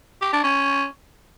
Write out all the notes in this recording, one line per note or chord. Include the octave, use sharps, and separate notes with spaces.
G4
D4
C#4